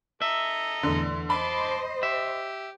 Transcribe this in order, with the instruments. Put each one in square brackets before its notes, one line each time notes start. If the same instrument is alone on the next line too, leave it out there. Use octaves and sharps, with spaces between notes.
[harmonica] A4 D#5 A#5 [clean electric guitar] E5
[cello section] E2 A2 [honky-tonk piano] D3
[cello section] C5 D#5 [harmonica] A5 C6 D6 [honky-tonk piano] B5
[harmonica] G4 [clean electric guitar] E5